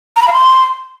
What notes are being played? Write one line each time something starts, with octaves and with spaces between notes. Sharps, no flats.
A#5
B5
F5
C6